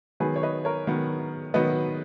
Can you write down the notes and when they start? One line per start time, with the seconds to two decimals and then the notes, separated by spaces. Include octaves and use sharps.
0.20 D#3 F#3 B3 G#4 B4
0.36 C#5
0.43 B4 D#5
0.65 A#4 C#5
0.87 D#3 F#3 B3
1.54 D#3 F#3 B3 B4 D#5